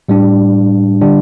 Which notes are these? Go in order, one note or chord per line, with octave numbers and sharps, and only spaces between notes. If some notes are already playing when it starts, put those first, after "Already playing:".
A2 G3 D4
D3 G3 D4